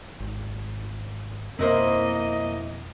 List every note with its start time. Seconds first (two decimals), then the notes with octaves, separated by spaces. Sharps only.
0.20 G#1
1.59 F2 B2 A#3 C4 E4 A#4 C5 D#5